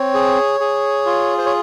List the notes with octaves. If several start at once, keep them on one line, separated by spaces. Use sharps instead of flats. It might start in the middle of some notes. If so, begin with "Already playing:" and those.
Already playing: C4 C#5
G#4
G#4
F4
C5
C#5